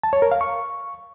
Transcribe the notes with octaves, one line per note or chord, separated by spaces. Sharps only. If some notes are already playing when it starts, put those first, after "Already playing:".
A5
C#5
A#4
F5
C#6